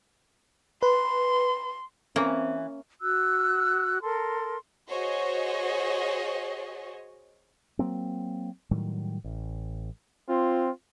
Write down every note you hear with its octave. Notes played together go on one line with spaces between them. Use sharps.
B4 C6
E3 A#3 C4 C#4
F#4 E6 F#6
A4 A#4 C6
F#4 G#4 C5 C#5 D#5
F#3 A#3 C4
A2 D#3 F#3 G3
A1
C4 F4